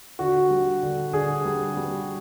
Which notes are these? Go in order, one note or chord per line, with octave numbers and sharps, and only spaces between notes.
D3 F#4
G3
D3
D3 G#4
G3
G3